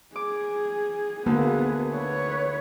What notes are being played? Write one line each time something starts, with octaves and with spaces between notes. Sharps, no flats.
G#4 D6
D2 A#3 B3 G#4
B4 C#5